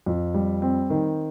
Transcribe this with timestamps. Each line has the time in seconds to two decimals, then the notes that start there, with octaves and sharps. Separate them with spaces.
0.06 F2
0.34 G3
0.62 C4
0.90 D#3